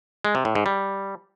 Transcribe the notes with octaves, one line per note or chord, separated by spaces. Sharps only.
G#3
C3
A2
G#2
G3